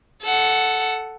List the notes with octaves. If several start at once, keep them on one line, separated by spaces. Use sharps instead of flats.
A4 F#5